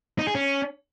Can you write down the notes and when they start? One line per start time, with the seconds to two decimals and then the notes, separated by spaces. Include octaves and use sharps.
0.19 D#4
0.27 G#4
0.35 C#4